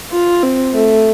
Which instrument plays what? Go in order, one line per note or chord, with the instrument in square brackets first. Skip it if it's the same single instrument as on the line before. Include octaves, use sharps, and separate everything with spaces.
[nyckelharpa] F4
C4
A3